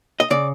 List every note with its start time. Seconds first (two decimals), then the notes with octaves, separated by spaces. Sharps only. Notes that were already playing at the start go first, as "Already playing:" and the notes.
0.20 D#5
0.30 C#3 D5